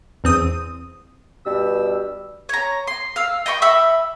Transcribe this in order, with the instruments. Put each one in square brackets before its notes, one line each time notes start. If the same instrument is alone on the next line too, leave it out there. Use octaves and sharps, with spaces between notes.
[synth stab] E2 C4 D#6
[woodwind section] G2 B2 G3 E6
[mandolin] C#5 A#5
C6
F5 E6
D#5 G5 B5 C#6
E5 B5 E6